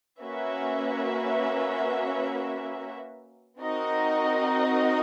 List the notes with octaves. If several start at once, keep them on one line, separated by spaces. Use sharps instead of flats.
A#3 C#4 F#4 B4 E5
C4 D#4 F#4 A#4 D#5